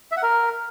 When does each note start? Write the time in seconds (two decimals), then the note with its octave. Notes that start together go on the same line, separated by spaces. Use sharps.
0.12 E5
0.17 F#5
0.23 A#4